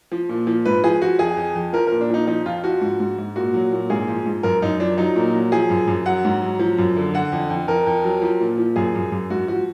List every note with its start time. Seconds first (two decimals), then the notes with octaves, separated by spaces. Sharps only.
0.12 F3
0.29 A#2
0.47 F3
0.65 G#2 B4
0.84 F3 G#4
1.02 F3 F#4
1.19 F2 G#4
1.37 F2
1.56 F2
1.73 F3 A#4
1.87 A#4
1.92 A#2
2.01 D4
2.10 F3 D#4
2.27 F3 D#4
2.46 F2 F4
2.64 F3 F#4
2.81 G#2
3.00 G#2
3.18 G#2
3.36 A#2 F#4
3.54 F#3
3.72 A#2
3.90 G#2 G#4
4.08 F3
4.26 G#2
4.43 F#2 A#4
4.62 F#2 D#4
4.80 F3 D4
4.98 F#3 D#4
5.16 A#2
5.34 F#3
5.52 F3 G#4
5.70 F#2
5.87 F#2
6.06 F#3 F#5
6.25 G#2
6.42 F#3
6.59 F3
6.78 F#2
6.96 D3
7.14 D3 F#5
7.32 F2
7.50 F2
7.68 F2 A#4
7.87 F2
8.04 F#3
8.22 F3
8.40 A#2
8.58 F3
8.76 F#2 G#4
8.95 F#2
9.12 F#2
9.30 G#2 F#4
9.48 F3 F#4